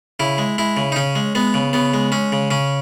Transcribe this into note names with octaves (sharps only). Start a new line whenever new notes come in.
C#3 E4
G#3
G#3 E4
C#3
D#4
C#3 C#4
G#3
G#3 B3
C#3
C#3 B3
G#3
G#3 C#4
C#3
C#3 C#4